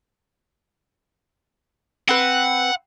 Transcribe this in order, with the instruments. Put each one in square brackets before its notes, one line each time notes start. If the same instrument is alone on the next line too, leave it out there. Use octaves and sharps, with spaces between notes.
[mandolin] C4 B4 [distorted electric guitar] F#5